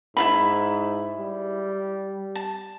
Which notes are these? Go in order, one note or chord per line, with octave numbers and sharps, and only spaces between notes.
G#2 E4 F4 B5
G3
A5